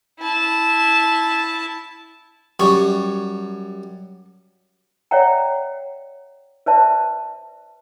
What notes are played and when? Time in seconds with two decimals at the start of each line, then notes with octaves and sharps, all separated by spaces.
0.20 E4 A5
2.60 F#2 G3 C#6
5.11 C#5 D5 E5 F#5 G5 A#5
6.66 B4 C5 D5 E5 A5